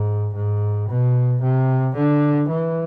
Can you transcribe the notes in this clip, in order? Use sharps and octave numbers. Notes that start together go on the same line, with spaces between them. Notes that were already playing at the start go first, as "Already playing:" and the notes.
Already playing: G#2
G#2
B2
C3
D3
E3